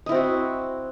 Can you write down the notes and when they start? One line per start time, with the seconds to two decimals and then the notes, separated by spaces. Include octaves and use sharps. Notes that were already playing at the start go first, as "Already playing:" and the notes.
0.06 D#5
0.09 E4
0.12 C4
0.15 F#4